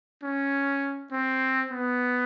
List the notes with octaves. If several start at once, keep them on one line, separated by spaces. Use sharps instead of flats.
C#4
C4
B3